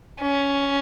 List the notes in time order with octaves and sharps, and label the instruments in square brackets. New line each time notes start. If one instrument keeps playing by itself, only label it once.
[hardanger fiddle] C#4